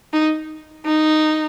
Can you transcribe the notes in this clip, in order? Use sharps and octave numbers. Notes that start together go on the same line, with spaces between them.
D#4
D#4